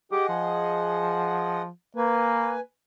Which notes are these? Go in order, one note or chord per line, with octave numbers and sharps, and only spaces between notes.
G4 G#4 D#5 F#5
F3
A#3 B4 G#5